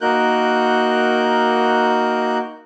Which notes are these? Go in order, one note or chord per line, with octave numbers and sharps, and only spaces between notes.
A#3 D#4 F#4 A#4 F#6 G6